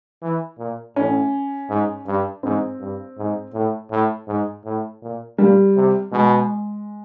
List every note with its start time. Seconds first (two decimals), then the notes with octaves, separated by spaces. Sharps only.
0.22 E3
0.59 A#2
0.96 A2 C#4
1.70 G#2
2.06 G2
2.43 G#2 C4
2.80 G2
3.18 G#2
3.54 A2
3.91 A2
4.28 G#2
4.65 A2
5.02 A#2
5.38 A#2 G3
5.76 C3
6.12 B2 G#3